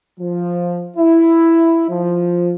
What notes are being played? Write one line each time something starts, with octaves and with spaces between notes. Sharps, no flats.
F3
E4
F3